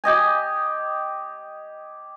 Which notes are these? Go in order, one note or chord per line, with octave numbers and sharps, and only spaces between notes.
G4 D#5 G#5